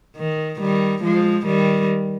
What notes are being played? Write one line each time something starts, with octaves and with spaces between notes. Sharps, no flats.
D#3
D#3 G3
F3 G#3
D#3 G3